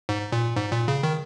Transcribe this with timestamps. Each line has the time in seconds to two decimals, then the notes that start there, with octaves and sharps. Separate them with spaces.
0.09 G#2
0.32 A#2
0.56 G#2
0.72 A#2
0.88 C#3
1.03 D#3